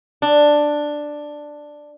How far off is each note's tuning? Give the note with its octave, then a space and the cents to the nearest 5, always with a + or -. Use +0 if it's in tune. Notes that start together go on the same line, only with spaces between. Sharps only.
D4 +5